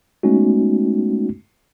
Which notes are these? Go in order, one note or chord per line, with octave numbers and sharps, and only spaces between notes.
G#3 A3 B3 C#4 D#4 F#4